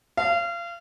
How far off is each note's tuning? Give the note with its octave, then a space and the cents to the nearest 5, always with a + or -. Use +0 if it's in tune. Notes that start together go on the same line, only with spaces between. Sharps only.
F5 -30